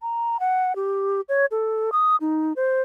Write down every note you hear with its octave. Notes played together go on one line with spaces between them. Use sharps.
A#5
F#5
G4
C#5
A4
D#6
D#4
C5